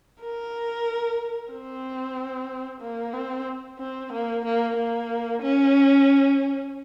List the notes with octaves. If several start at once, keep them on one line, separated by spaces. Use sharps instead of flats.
A#4
C4
A#3
C4
C4
A#3
A#3
A#3
C#4